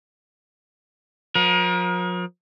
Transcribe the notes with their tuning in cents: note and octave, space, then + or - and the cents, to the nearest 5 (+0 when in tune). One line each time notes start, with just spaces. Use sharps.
F3 +40 A#4 +35